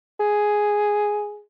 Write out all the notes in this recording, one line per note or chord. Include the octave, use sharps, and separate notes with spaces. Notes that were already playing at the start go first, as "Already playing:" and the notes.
G#4